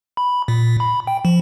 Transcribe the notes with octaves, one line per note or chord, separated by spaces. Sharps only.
B5
A#2
B5
G5
F3